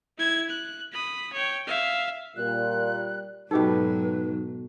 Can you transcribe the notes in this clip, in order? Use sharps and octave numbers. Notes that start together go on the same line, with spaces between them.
E4 G#6
F#6
B5 D#6
C#5 G5
E5 F5
A#2 G3 F#6
G#2 B2 F#3 D#4 G4 A4 B4